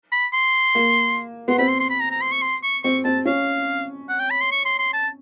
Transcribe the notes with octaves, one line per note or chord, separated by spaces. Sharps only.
B5
C6
A#3
B3 C6
C4 B5
C6
C6
B5
A#5
A#5
C6
C#6
C6
C#6
C4 C#6
C4 A5
C#4 F5
F#5
G5
B5
C6
C#6
C6
C6
A5